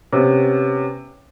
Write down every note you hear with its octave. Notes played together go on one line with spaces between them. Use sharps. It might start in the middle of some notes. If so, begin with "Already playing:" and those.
C3 B3 C#4